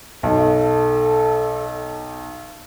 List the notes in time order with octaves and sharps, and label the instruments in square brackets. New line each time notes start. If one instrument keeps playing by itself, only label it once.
[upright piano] B1 [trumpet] A4